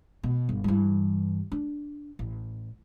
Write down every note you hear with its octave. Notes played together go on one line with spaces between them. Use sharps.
B2
G1
G2 E3
D4
A1